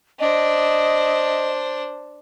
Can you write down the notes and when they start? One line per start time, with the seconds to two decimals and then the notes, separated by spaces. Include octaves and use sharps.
0.20 D4 C5 D#5